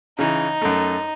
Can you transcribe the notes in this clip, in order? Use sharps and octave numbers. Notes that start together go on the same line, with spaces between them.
C#3 E3 D#4
F#2 A3